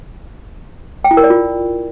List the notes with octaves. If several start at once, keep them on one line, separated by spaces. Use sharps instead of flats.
G5
E4
A#4
D5
F4